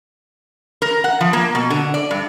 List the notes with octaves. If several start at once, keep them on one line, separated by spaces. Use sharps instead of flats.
A#4
F#5
F3
A#3
B2
D3
D5
G2